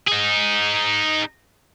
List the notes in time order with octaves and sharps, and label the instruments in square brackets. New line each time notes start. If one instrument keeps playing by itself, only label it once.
[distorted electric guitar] D#4 G#4